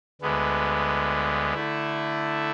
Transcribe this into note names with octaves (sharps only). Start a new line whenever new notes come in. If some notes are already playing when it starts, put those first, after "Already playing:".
D2 D3 G#3 B3
D3 A3 E4